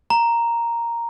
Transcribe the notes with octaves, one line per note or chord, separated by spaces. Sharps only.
A#5